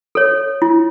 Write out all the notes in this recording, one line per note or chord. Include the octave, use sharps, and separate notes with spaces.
A4 C#5
E4